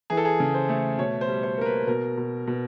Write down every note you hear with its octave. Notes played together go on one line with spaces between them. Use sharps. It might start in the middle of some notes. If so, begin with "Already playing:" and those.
E3 G#4
A4
G#4
C#3
C5
A3
B2 C#5
C5
G3
C5
A#3 A#4
B4
B2 A#4
B2
B2